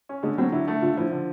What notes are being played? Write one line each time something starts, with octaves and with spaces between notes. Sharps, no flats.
C#4
D3 G#3
F#3 C4
D3 E4
A3
D3 F4
F3 E4
D3